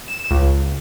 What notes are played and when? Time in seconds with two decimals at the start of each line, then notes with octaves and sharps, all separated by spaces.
0.08 E7
0.31 C#2